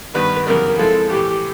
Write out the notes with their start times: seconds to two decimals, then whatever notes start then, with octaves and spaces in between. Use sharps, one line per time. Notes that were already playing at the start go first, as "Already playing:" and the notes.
0.15 G2 D#3 G3 B3 B4
0.47 F#2 C#3 E3 G3 B3 A#4
0.78 F3 G#3 C4 E4 A4
1.10 A2 E3 A3 G4